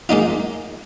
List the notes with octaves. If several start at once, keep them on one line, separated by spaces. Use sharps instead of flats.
G#3 A#3 D#4 F4